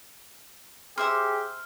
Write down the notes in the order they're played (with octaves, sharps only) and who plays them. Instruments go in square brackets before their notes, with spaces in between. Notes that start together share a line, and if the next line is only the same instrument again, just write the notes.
[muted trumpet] G4 [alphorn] G#4 [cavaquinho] C5 E5 C6 [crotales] F6